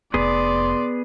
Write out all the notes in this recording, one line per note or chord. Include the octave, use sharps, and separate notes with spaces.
F1 B3 G#4 D5 C6